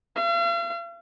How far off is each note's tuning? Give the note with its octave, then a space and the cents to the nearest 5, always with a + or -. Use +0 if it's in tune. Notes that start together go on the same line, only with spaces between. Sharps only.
F5 -45